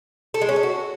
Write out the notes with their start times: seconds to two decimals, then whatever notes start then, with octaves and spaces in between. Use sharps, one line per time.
0.34 A4
0.42 G#3
0.49 C#4
0.56 A4
0.63 F#4